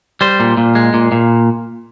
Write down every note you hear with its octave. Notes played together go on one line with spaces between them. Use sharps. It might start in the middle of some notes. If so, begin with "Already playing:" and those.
G3 C5
A#2
A#2
G#3
A#2
A#2